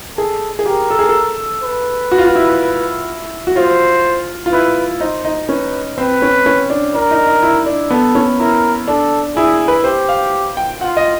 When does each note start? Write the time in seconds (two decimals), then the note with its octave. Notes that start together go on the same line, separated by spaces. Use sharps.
0.18 G#4 A4
0.59 G#4
0.66 G4 A#4
0.91 A4
0.99 G#4
1.09 A4
1.63 B4
2.12 F#4
2.18 F4
2.26 F#4
2.36 E4
3.47 F#4
3.56 F4 C5
4.46 F4
4.52 E4 B4
5.00 D#4 C5
5.25 D#4
5.49 C#4 B4
5.98 C4 B4
6.22 C#4
6.46 C#4
6.70 D4
6.94 D4 A#4
7.11 D#4
7.27 D#4
7.43 E4
7.66 D4
7.91 B3 A4
8.15 C#4
8.39 E4 A#4
8.88 D4 A4
9.36 E4 G#4
9.68 B4
9.84 G4 C5
10.09 F5
10.57 G5
10.81 F4 F#5
10.97 D#5